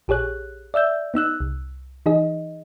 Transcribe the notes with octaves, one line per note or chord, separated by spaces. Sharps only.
A#1 G4 G#4 C#5 F#6
D5 E5 E6 G6
B3 D#4 E6 F#6
C2
E3 D#4 G#4 D#5